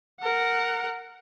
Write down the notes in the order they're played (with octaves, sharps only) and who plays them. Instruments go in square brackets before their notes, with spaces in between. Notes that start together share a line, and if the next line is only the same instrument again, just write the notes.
[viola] A#4 F#5